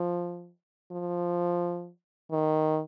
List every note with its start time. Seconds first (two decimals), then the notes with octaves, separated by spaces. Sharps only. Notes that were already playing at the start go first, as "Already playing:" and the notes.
Already playing: F3
0.92 F3
2.31 D#3